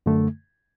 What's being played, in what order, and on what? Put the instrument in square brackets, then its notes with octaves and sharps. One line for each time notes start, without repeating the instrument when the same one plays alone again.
[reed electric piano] F#2 D3 A3